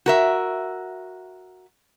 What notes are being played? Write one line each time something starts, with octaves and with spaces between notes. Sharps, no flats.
F#4 A#4 E5